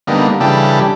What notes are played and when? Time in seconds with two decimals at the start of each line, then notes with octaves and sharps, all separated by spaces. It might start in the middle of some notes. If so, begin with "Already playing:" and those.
0.07 D3 G3 A#3 B3 D#4
0.40 C#3 E3 G3 D4 G4 A4